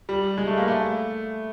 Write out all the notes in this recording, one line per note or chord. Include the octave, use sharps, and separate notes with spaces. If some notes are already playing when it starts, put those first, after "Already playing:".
G3
G#3
A3
A#3
A3